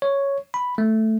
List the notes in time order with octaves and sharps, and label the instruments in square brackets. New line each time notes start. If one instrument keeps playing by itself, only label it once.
[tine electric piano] C#5
B5
A3